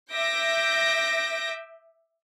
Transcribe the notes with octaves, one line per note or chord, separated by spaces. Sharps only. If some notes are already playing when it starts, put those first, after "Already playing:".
E5 D6 G6 A#6